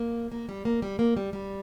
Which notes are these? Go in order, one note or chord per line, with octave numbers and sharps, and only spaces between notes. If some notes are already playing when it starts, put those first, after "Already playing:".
Already playing: A#3
A#3
G3
A#3
G3
A#3
G3
G3